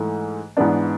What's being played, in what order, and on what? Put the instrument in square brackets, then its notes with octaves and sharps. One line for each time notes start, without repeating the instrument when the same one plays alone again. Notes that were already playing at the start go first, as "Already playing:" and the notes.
Already playing: [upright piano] G#2 E3 A3
G#2 E3 B3 D4